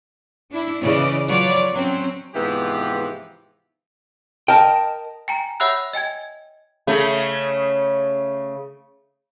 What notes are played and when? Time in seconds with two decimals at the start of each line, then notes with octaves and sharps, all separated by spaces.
0.50 D4 E4
0.81 C#3 E3 D5 D#5
1.26 F3 F#3 F4 B4 C#5 D5
1.74 F#3 C4 C#4
2.35 G#2 C3 E3 F3 B3 G4
4.48 A#4 D#5 G5 A5
5.28 G5 G#5 A#5
5.60 C#5 E5 F#5 B5 E6 F#6
5.93 D#5 G5 G#5 G#6
6.87 C#3 A3